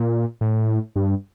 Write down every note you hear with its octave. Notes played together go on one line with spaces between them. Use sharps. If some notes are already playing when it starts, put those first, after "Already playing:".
Already playing: A#2
A2
G2